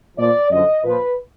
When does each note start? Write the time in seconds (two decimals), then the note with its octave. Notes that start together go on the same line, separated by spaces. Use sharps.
0.17 A#2 F3 D5
0.51 F#2 D3 F3 D#5
0.83 A#2 F3 B4